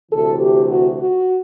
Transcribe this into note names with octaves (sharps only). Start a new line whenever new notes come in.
D2 C3 E3 A4
G4
F#4
F#4